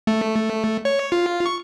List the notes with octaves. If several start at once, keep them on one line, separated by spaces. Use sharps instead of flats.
A3
C#5
F4
C#6